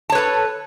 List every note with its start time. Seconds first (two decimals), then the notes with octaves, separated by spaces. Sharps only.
0.10 A5
0.12 C#5
0.15 B4
0.18 A4